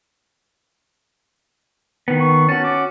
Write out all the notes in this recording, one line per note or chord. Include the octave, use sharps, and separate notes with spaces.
D#3 B3
C#6
C#4 F#4 A5
D6